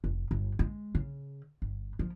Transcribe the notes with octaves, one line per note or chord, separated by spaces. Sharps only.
F1
G1
G#3
C#3
G1
F3